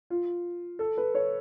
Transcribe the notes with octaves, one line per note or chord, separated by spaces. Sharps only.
F4
A4
B4
C#5